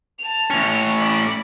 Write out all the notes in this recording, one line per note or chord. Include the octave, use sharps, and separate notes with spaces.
A5 F7
A2 C#4
D5 B5